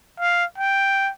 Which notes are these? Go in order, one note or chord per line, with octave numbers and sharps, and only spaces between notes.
F5
G5